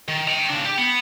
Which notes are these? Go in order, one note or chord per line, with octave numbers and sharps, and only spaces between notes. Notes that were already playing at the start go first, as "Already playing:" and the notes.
D#3
G5 A#5
C#3 D4
G4
B3